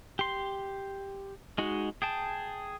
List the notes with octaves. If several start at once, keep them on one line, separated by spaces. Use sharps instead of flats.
G4 C6
G#3 D#4 F#4
G#4 G5 A5